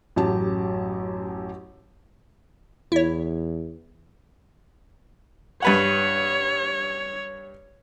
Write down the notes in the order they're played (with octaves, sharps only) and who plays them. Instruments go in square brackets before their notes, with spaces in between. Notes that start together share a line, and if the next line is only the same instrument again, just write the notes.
[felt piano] A1 F#2 F#3 G4 A5
[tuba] E2 [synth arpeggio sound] E4 C#5
[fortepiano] G2 B4 F#5 [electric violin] C#5